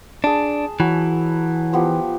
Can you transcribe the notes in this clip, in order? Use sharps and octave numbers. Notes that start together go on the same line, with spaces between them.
D4 G#4 A5
E3 F#3
F3 B3 G4